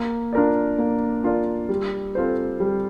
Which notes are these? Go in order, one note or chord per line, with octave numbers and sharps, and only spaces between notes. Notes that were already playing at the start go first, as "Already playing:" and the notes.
Already playing: A#3
D4 F4 A#4 D5
A#3
D4 F4 A#4 D5
G3
C4 F4 A4 C5
G3